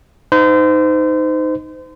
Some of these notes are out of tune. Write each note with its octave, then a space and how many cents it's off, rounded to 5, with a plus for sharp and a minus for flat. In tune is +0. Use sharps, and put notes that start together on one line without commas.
D#4 +0 C5 -35